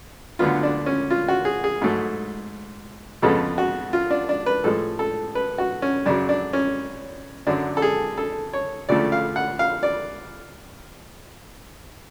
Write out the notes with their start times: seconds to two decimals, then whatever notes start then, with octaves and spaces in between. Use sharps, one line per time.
0.39 D2 D3 F#3 B3 F4
0.63 D4
0.86 C#4
1.10 F4
1.28 F#4
1.45 G#4
1.64 G#4
1.82 G#2 F#3 A3
3.22 F2 C#3 G#3 B3 A4
3.58 F#4
3.93 F4
4.11 D4
4.29 D4
4.46 B4
4.64 A2 F3 G#3 A4
4.99 A4
5.35 B4
5.58 F#4
5.82 C#4
6.06 F#2 C#3 F#3 D4
6.29 D4
6.53 C#4
7.47 F#2 D3 F#3 D4
7.77 A4
7.82 G#4
8.18 A4
8.53 C#5
8.89 D2 C#3 F3 A3 D5
9.12 F5
9.36 F#5
9.59 F5
9.83 D5